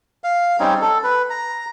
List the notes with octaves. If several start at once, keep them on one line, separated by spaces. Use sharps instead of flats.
F5
G3 C4 C#4 D#4
A4
B4
A#5